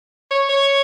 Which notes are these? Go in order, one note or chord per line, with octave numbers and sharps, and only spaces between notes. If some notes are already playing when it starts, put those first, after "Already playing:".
C#5
C#5